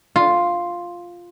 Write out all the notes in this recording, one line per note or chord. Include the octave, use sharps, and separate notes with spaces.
F4